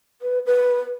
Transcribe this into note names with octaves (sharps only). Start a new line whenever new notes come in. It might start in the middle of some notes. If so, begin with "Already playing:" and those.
B4
B4